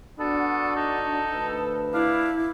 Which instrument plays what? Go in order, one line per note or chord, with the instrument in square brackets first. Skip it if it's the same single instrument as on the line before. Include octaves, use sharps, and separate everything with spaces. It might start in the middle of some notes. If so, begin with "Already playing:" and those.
[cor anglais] B3 [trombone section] D4 F#4 [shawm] A4
[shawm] D#4 [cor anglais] A4
[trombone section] D2 B4
[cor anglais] D4 [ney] E4 [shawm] F5